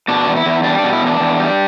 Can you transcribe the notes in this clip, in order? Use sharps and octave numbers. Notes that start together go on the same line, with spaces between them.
B2 D4
E2
E4
E2
G3 D4
B2 D4
E4
E2
D4
E2
G3